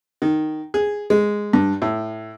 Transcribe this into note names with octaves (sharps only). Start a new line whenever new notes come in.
D#3
G#4
G#3
G2
A2